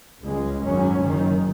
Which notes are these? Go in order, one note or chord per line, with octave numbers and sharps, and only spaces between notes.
C#2 C#3 G#3
G#1 F#2 F#3 C#4
F#1 F#2 D#3